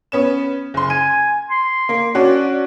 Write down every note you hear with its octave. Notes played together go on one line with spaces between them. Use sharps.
B3 C#4 E7
F#1 C6
G#5 D#7
C6
A#3
C#4 D4 F#4 D5